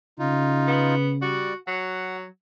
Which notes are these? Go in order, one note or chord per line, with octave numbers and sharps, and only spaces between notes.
C#3 D#4 F4
B3
G3 F#4 D5
F#3 F#5